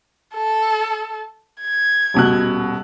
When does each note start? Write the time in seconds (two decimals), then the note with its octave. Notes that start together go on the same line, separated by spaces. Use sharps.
0.35 A4
1.61 G#6
2.14 D#1 B2 F#6